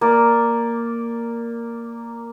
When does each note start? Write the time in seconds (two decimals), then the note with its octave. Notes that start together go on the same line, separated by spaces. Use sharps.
0.01 A#3 D5